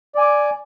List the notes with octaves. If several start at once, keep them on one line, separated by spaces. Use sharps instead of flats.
D5 G#5 D6